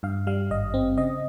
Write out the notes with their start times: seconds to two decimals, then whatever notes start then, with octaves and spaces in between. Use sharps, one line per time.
0.03 G2 F5
0.27 G3 F5
0.50 G#1 D#5
0.74 C4
0.98 C#3 D#5